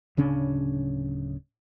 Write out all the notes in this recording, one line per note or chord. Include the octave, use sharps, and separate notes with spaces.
D1 C#3 C#4 D4